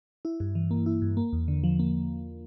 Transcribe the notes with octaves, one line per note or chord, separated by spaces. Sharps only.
E4
G2
E3
A#3
E4
G2
A#3
E2
D3
F3
A#3